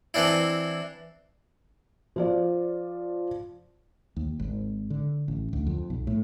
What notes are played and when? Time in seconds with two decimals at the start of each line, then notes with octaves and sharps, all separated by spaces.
0.14 E3 C4 D4 E4
2.16 F3 F4 D5
4.16 D#2
4.39 G#1
4.90 D3
5.28 A1
5.53 D2
5.67 F2
5.90 B1
6.07 A2